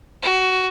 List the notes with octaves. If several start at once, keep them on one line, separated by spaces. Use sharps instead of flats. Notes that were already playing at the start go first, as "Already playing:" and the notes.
F#4